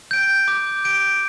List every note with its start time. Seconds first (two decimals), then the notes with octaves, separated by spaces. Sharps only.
0.11 G6 D7
0.48 D6
0.84 G6 D7